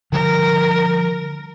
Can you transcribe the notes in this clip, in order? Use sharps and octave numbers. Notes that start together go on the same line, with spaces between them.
D3 F3 G3 A#4